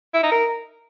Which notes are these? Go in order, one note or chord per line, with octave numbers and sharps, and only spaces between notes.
E4
D#4
A#4